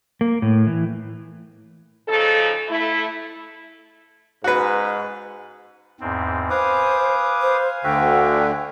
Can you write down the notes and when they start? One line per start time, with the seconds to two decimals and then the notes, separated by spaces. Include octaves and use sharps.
0.21 A#3
0.42 A2
0.67 E3
2.09 C#3 F3 D#4 A4
2.69 A3 E4
4.44 G#2 F#4 B4
6.00 E2 G#2 C4
6.50 B4 C5 F5 G#5 D6 D#6
7.42 C5
7.84 D2 D3 F#4 E5 G5